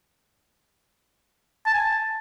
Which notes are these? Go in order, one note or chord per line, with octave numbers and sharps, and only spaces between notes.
A5
G#5
A5